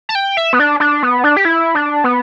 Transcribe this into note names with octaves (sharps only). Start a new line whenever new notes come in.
A5
G5
E5
B3
D4
D4
B3
D4
G4
E4
D4
B3